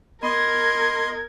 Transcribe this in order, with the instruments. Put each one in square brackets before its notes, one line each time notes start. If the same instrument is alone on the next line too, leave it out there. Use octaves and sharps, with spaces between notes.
[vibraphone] B3 [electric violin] A#4 G#6 [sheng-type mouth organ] D#5 C6